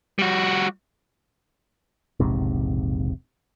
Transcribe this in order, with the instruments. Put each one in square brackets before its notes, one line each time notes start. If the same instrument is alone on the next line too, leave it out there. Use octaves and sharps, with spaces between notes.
[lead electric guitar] G3 F#4
[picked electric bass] E1 A#1 G#2 C3